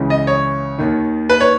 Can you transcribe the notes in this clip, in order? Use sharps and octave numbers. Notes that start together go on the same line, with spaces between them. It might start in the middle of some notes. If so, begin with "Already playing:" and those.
Already playing: C#2 C#3 E3
D#5
C#5
D#2 D#3
B4
C#5